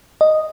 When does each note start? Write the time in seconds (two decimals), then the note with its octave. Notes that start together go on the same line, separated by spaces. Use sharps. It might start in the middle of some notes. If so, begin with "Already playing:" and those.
0.21 D#5